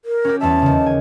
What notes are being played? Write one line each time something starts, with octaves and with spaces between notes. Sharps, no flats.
A#4
C#4 F#4 G4
E2 G3 E5 A5
D#2 C#3
G#5